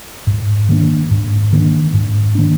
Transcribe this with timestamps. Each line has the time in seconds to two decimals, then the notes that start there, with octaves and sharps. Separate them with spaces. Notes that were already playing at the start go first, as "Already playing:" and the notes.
0.27 G#2
0.69 D#3 A#3 D4
1.11 G#2
1.53 D#3 A#3 D4
1.94 G#2
2.35 D#3 A#3 D4